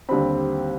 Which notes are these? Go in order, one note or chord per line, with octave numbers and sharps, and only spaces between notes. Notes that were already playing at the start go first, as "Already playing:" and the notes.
D#2 D3 G3 C4 B5